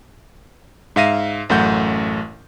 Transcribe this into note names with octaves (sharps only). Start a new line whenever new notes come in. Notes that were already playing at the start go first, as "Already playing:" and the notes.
G#2 E5 F5 A#6 D#7
A1 F#2 A3 F#5 G6